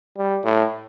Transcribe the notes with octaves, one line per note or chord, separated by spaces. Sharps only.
G3
A2